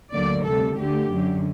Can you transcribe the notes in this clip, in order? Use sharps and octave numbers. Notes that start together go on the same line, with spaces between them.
D2 D3 F#3 A#3 D5
D2 C3 G3 A4
D2 D3 A3 G4
F#2 D3 F#3